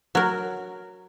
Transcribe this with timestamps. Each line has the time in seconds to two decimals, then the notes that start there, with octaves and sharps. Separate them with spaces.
0.15 F#3 A#4